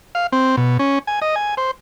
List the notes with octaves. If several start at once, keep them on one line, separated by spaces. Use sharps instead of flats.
F5
C4
B2
C#4
G#5
D#5
G#5
C5